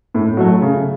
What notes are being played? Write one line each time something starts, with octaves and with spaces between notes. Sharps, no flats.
A2
F#3 A3
C#3